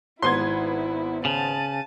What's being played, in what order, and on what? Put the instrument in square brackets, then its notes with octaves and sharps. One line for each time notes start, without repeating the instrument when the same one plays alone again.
[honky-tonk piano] G#1 B3 G#6 [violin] E4 [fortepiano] C6
[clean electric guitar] C#3 [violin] A5 D#7